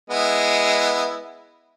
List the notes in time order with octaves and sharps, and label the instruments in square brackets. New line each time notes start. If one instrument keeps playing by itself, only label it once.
[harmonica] G#3 B3 E4